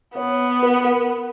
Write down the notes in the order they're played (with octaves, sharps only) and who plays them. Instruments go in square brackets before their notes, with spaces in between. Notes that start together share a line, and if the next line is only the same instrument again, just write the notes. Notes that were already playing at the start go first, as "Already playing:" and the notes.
[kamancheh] B3 [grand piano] C#5
[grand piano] B4
A#4